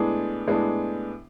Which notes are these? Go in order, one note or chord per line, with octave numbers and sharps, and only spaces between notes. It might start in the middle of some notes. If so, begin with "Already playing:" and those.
Already playing: A2 G#3 B3 D4
A2 G#3 B3 D4